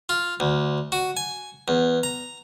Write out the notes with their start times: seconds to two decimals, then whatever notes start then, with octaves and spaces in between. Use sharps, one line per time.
0.09 F4
0.40 D2
0.92 F#4
1.17 G#5
1.68 E2
2.03 A#5